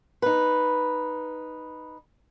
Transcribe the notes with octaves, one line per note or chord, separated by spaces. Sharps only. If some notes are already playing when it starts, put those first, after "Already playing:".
D#4 B4